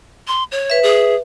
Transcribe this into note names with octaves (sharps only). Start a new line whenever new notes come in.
C6
C#5
B4 E5
G#4